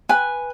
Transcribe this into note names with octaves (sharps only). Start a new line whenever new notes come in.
B4 G#5